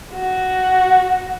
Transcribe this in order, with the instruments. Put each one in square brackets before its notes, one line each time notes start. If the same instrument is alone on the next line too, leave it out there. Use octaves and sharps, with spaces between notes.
[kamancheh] F#4